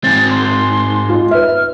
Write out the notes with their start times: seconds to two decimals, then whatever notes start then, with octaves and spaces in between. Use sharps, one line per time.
0.04 G#2 C4 A6
0.31 C6
1.09 D#4 F4
1.31 B4 E5 F6